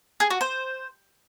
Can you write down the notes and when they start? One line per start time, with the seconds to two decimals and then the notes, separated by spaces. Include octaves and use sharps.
0.20 G#4
0.30 F#4
0.41 C5